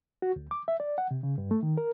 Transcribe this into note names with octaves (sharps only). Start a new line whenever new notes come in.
F#4
D2
D6
E5
D5
F#5
C3
C#3
G2
A3
D#3
A#4